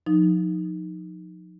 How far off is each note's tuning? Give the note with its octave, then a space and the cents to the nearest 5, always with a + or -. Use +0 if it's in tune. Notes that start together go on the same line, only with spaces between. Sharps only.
F3 +35 D#4 +0